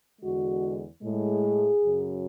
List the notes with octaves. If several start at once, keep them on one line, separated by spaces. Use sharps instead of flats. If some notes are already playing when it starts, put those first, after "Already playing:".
E2 D3 G#3 F#4
A2 G#3 G#4
F#2 C#3 F#3